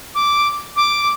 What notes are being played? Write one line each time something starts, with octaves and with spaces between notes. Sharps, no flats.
D6
D6